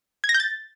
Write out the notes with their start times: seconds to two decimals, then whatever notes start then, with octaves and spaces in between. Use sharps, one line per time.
0.24 G#6
0.29 A#6
0.34 G6
0.40 A6